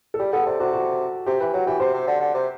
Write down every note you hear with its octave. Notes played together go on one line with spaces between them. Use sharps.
A4
G3 G4
B3 A4
C3 D5
C3 F#4
F#4
C3 G4
E3 B4
F#3 F#4
E3 G4
C3 C5
C3
D3
D3
C3